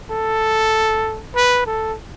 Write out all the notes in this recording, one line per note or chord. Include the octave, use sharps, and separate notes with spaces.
A4
B4
A4